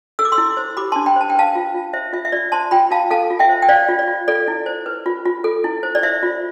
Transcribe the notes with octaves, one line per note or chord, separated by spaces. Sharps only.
A4 E6
D6
C6 E6
E4
C5
G4 B5 D6
D4 A5 C6
G5 B5
C5 A5
G5
B4 F5 A5
F4
F4
C5 E5
F4 E5
E5
F4 D5
C5 A5 C6
F4 G5 B5
F4 F5 A5
A4 F5 A5
F4
E5 G5
C5
G5
C5 D5 F5
F4
D5
F4
A4 D5
E4
C5
B4
F4
F4
A4
E4
C5
D5
C5 E5
F4